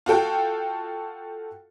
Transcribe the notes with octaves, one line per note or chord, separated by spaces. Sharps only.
F4 F#4 A4 G5